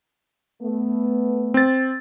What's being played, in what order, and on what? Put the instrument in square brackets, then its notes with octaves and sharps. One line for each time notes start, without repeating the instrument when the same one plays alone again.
[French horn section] A3 B3
[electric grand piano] C4 A6